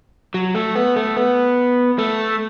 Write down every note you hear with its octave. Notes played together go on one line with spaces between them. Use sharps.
F#3
A3
B3
A3
B3
A3